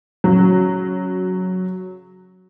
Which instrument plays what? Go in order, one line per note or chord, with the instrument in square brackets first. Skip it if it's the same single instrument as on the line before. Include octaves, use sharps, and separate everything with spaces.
[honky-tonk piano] C#3 F#3